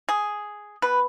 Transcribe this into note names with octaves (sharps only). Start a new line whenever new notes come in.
G#4
B2 B3 B4